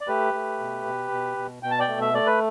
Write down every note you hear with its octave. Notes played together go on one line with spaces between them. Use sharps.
D5
A3 G4 B4
A3
B2
B2
B2
B2
B2 G5
A5
D5 G5
A3
E5
A3 D5
B4